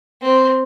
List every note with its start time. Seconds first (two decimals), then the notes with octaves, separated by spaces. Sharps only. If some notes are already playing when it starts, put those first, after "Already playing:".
0.22 C4